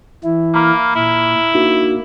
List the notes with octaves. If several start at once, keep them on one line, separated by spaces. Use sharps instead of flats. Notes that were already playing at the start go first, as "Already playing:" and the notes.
E3 E4
A#3 A#5 B5 F6
A#2 E4
A#3 D4 D#4 F#4